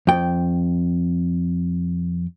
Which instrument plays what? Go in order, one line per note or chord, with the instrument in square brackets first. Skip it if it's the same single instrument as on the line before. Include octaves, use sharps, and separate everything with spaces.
[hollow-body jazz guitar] F2 G5